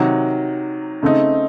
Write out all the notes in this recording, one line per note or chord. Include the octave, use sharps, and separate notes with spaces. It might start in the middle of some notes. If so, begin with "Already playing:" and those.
Already playing: C3 D#3 F#3
C#3 A3 C4 D#4